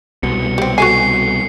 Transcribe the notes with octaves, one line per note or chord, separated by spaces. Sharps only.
C2 B2 C#7
G3 C4
F#4 A4 G#5 C7